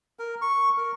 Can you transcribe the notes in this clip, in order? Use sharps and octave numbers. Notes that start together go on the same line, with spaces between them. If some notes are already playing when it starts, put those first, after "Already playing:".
A#4
C#6
A#4